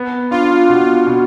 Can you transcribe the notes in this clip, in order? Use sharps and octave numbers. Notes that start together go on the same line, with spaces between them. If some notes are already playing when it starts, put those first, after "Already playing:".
Already playing: B3
D4 F4
B2
B2